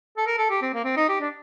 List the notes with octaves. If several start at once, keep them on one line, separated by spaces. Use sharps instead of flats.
A4
A#4
A4
G4
C4
A#3
C4
D#4
G4
D4